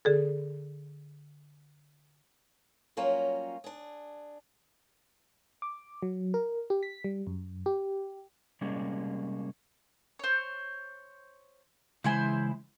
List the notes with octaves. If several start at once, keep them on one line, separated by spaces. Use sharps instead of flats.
D3 G#4 A4
F#3 G3 A#3 C#4 F4
D4 G#4
D6
F#3
A#4
G4
B6
G3
F#2
G4
C3 G3 G#3 A#3 C#4
C5 C#5
C#3 E3 G#3 E4 C5 G#5